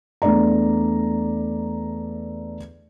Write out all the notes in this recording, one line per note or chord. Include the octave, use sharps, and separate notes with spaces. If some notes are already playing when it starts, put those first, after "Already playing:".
E2 A3 D4 D5 A#5